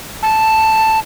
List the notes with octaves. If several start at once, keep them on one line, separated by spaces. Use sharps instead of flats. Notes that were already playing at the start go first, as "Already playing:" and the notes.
A5